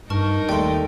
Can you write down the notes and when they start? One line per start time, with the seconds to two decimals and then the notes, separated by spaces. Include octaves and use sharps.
0.10 G2 D#4 A#4 A5 C#6 F6
0.49 D#2 G3 A3 G5 C6